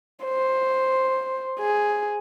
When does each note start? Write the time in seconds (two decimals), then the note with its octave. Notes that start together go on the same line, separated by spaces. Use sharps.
0.25 C5
1.59 G#4